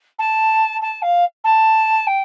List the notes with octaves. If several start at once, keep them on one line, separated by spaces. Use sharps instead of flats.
A5
A5
F5
A5
G5